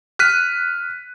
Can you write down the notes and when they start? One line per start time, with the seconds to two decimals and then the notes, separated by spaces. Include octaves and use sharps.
0.19 F6 F#6 B6 D#7